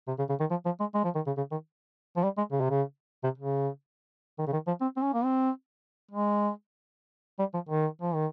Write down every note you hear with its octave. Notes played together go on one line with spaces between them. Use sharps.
C3
C#3
C#3
D#3
F3
F3
G#3
G#3
F3
D#3
C#3
C#3
D#3
F3
G3
G#3
C#3
C3
C#3
C3
C#3
D#3
C#3
D#3
F3
C4
C4
C#4
A#3
C4
G#3
G3
F3
D#3
F3
D#3